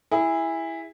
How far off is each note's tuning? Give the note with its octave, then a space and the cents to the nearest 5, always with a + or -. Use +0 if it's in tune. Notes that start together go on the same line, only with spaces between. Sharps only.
E4 +0 G#4 -25